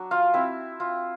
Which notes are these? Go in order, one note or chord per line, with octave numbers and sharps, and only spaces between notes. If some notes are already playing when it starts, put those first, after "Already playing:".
Already playing: F#3 D4
F4 F5
C4 E4 E5
F4